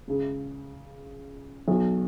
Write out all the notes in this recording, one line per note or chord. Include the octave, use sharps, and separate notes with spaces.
C#2 C#3
B1 B2